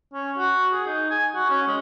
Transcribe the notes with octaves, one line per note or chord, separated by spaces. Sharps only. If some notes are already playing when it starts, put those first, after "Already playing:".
C#4
F#4
G#4
D#4
G#5
F#4
C#4
G#3